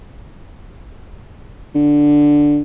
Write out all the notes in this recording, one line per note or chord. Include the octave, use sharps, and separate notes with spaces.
D3